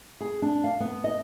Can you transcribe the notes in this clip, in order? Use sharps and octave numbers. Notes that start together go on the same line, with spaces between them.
G#4
D4
F5
B3
D#5